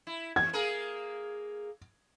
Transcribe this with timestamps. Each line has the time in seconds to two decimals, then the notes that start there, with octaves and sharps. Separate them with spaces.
0.07 E4
0.36 E2 G#6
0.53 A#3 G#4 A#4